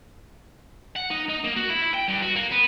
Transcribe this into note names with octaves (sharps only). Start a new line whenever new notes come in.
F#5
D#4
D#4
A#3
F#4
E4
E4
G5
G2
F#4
A#3
B3